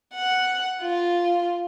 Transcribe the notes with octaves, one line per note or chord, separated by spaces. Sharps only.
F#5
F4